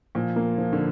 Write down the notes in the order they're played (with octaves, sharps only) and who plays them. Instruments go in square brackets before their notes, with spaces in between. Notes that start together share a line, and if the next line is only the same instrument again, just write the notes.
[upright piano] A#2 [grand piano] F3
[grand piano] A#3
F3
[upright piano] D3